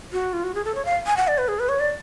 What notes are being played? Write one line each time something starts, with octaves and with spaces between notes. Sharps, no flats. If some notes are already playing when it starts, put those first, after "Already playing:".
F#4
F4
F#4
G#4
A4
C#5
F5
G#5
F#5
D5
B4
G#4
B4
C#5
D5